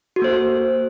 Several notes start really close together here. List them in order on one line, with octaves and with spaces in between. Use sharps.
F#4 A4 A#3 C5